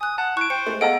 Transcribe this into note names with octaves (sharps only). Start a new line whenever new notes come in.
G#5 D#6 F#6
F#5 A5
E4 C#6 F#6 D7
C5 G5 C#7
G#3 A3
B3 G#4 A4 D#5 F5 F#5 A#5 D7